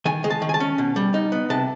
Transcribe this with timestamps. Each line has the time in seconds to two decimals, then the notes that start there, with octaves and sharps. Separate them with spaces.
0.05 D#3 G#5
0.24 G#3
0.30 A5
0.42 D#3
0.49 G#5
0.54 A5
0.60 C#4
0.78 B2
0.96 G3
1.14 D#4
1.32 B3
1.50 C3 A5